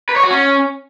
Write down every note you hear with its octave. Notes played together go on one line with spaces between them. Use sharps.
B4
C#5
F#4
C#4